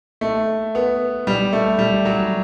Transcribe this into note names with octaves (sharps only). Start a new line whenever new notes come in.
A3
B3
G3
A3
G3
F#3